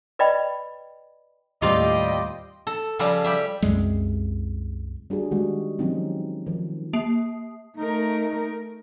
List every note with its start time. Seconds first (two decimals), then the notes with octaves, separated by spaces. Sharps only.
0.19 B4 D5 D#5 G5 B5
1.62 D#2 A2 G3 C4 F4 G4 D5 D#5
2.67 A4
2.99 C#3 F3 G3 A4 F5
3.24 G3 G4 E5
3.62 C2 F#2 G3 G#3
5.10 G3 D4 F#4 G#4
5.31 D#3 G3 G#3 F#4
5.79 D#3 F3 F#3 C4 C#4 D#4
6.46 D#3 F3
6.93 A#3
7.77 A3 D#4 A#4